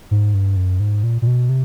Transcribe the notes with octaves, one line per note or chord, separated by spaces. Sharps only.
G#2
G2
F#2
G#2
A#2
A#2
B2
C3